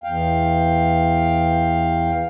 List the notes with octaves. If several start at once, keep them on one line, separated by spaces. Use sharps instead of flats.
E2 F5 G5